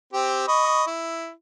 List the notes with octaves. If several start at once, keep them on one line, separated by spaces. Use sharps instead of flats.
C4 G4
D#5 B5 C#6
E4